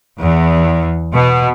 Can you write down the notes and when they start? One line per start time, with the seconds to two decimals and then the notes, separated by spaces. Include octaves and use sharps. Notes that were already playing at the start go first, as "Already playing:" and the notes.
0.19 E2
1.12 B2